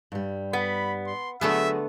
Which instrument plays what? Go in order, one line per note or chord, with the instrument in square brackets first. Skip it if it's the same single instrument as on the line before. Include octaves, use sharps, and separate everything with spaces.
[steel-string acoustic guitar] G2 G3
[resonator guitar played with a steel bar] B3 [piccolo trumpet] B5
[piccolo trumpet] C6
[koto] D3 A3 B3 [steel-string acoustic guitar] F#3 F#4 G#4 [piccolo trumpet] E5